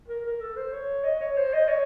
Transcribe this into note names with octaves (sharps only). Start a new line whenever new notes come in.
A#4
A#4
A4
C5
C#5
D#5
C#5
C5
D#5
C#5